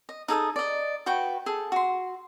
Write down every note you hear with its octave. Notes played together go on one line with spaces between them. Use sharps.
D#5
D#4 G#4 A4 D#6
D5 D#5
F#4 B4 G5 C#6
G#4 A4
F#4 C6